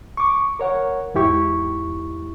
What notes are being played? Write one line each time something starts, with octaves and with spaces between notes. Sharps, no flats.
C#6 D6
A#4 C#5 F#5
E2 G#2 E4 G4 C#6